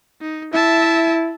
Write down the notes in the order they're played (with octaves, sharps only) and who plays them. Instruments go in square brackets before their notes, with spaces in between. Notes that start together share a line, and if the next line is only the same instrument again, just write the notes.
[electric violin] D#4
[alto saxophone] E4 [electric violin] E5 A5